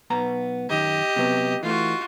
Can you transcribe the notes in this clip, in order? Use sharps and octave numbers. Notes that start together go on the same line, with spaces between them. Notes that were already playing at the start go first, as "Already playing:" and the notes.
B1 B3 A#5
F#2 D#3 G4 D#5
C3 F#3 B3
E3 A3 F4 F#4